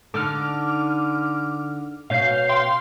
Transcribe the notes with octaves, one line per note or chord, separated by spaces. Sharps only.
D3 D#4 A4 D6 F6
B2 C#4 F5 G6 C7
F5 G5 C6